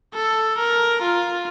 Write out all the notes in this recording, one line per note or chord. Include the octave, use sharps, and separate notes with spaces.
A4
A#4
F4